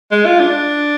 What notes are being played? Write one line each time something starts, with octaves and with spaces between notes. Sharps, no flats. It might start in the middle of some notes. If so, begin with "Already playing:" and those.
G#3
F4
D4